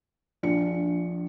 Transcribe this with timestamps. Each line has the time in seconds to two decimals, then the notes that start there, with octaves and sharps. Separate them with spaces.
0.43 A#1 D4 F4 C#7